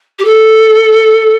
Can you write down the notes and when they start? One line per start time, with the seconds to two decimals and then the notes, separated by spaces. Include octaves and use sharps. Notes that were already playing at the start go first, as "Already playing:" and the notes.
0.18 G4
0.24 A4